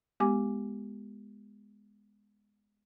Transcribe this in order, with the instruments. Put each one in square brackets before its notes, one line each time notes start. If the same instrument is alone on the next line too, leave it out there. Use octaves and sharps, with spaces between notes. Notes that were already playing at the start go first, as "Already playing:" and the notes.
[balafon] G#3 B3 G4 G#5 D6